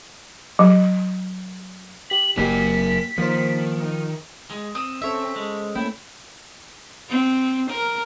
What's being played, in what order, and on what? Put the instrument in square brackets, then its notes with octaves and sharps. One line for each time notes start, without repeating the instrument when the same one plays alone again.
[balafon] F#3
[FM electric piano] G4 B6 [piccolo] F#7
[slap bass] F#1 F#3 [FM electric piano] A#3 G4 [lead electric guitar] A#4 G#5 [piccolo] B6
[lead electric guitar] D#3 [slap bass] F3 [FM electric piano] A#3 C5
[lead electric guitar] G#3
[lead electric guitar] C4 [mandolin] D#6
[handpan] C#4 A4 C5 [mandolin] C#5 E5
[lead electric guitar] G#3
[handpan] A3 A#3 C#4 [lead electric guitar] E4 [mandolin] G5
[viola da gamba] C4
A#4